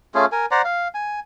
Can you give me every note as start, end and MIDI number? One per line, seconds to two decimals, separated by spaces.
0.15 0.26 57
0.15 0.26 61
0.15 0.26 65
0.15 0.26 68
0.32 0.46 70
0.32 0.46 80
0.51 0.62 72
0.51 0.62 74
0.51 0.62 78
0.51 0.62 82
0.65 0.88 77
0.94 1.20 80